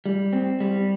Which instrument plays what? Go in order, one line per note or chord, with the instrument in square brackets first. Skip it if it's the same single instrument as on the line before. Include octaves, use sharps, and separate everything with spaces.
[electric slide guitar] G3
C4
G3